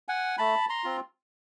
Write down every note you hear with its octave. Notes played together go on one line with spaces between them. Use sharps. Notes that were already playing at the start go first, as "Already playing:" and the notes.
F#5 G#5
A3 A5 B5
A#5 C6
C4 F4